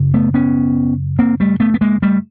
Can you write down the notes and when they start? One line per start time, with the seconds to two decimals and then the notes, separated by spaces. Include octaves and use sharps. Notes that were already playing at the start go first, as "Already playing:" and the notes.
Already playing: F#2 C#3
0.14 A3 B3
0.34 B3 C#4
1.19 A#3 C4
1.40 G3 A3
1.60 A3 B3
1.74 B3
1.81 G#3 A#3
2.02 G3 A3